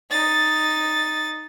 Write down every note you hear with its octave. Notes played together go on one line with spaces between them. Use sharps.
D#4 A6